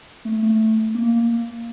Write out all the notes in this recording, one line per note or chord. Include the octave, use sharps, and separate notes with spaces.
A3
A3
A#3